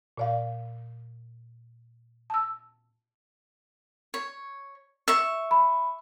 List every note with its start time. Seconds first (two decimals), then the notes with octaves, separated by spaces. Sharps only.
0.17 A#2 D5 F5
2.30 A5 E6
4.14 C#5
5.08 E5 C#6
5.51 B5